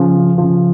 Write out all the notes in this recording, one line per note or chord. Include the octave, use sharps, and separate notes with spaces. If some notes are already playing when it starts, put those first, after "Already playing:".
Already playing: C#3 F3
C#3 F3